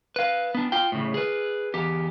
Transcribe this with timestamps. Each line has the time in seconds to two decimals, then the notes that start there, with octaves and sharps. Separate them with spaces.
0.16 B4 F5
0.55 B3 D4
0.72 F4 G5
0.92 A2 C#3
1.14 G#4 B4
1.74 E2 G4